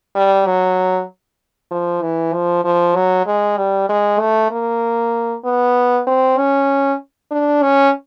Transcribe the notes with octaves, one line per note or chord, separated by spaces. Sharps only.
G3
F#3
F3
E3
F3
F3
F#3
G#3
G3
G#3
A3
A#3
B3
C4
C#4
D4
C#4